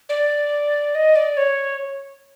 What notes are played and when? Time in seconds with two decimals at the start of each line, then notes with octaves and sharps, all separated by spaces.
0.09 D5
0.95 D#5
1.16 D5
1.37 C#5